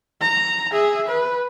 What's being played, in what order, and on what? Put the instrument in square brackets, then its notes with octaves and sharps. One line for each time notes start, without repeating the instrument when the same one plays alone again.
[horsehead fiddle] A#5
G#4 E5
B4